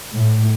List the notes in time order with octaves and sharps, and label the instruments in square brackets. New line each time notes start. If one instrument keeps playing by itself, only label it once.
[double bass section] A2